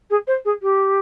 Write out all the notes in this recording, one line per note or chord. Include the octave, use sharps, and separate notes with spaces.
G#4
C5
G#4
G4